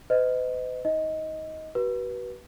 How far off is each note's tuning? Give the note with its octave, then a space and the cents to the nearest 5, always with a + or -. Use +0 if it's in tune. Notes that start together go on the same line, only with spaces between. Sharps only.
B4 +45 D#5 +5
D#4 +30 D#5 +15
F#4 +40 B4 -25